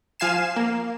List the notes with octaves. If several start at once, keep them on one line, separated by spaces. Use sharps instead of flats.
F3 F5 G#5 C7 E7
A#3